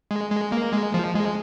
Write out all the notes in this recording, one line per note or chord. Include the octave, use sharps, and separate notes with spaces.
G#3
G#3
A#3
G#3
F3
G#3